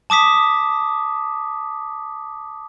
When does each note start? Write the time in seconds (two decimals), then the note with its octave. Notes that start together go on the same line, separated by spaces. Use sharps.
0.10 A5 D6 D#6 B6